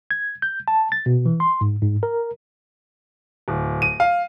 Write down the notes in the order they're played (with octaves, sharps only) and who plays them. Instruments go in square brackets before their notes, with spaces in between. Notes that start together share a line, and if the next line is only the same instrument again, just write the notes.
[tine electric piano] G#6
G6
A5
A6
B2
E3
C6
G#2
G#2
A#4
[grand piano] D1
D#7
F5